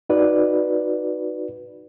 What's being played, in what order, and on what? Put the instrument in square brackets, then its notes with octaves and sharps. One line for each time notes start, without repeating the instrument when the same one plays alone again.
[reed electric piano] D#4 F#4 B4 D5